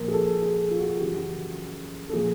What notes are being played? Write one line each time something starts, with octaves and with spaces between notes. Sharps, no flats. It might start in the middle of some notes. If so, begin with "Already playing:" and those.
Already playing: A#2 F3 A#4
G#4
A4
G#4
F4
F#4
F#2 C#3 E3 G4
F#4
G4
A4
A#2 F3 G#4